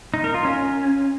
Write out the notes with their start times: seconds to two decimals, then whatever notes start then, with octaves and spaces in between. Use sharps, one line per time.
0.14 D#4
0.24 A#4
0.34 F4
0.45 C#4